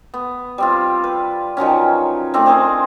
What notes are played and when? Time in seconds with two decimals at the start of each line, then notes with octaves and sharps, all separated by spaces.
0.14 B3
0.58 G3 C4 F4
1.04 B4
1.57 D#3 F3 F#3 C#4
2.34 A3 C4 D4
2.46 C4 G#4 A#4 C5